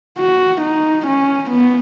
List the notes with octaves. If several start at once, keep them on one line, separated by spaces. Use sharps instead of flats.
F#4
D#4
C#4
B3